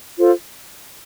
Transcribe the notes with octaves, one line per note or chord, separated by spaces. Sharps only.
F4 A4 C5